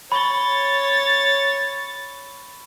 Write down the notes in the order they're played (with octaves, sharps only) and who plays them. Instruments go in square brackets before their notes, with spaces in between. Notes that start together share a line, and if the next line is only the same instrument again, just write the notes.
[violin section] C#5 A6 [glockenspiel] B5 C#6 G7